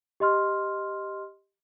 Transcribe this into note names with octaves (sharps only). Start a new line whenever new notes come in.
G4 D#5 C6 F6